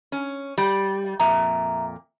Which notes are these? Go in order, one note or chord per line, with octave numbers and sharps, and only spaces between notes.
C#4
G3
F2 A#2 E5 A#5